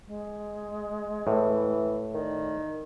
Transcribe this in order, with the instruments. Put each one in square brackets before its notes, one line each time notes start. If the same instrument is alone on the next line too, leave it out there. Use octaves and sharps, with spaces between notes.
[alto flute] G#3
[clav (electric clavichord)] A2 [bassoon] E3
[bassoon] D#3 [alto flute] D5